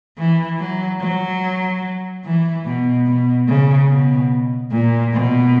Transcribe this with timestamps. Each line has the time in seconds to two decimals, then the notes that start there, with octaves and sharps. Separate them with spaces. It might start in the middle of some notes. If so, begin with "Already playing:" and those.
0.18 E3
0.59 F#3
1.01 F#3
2.24 E3
2.65 B2
3.07 B2
3.48 C#3
3.89 B2
4.72 A#2
5.13 B2